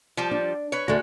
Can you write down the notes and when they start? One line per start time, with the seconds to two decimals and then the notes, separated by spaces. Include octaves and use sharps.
0.17 F3 G3
0.31 D4
0.72 B4 C#5
0.88 D2 G#3 A3 F#4